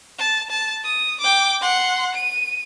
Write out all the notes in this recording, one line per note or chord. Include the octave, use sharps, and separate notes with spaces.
A5
A5
D#6
G5 D6
F#5 C6
D#7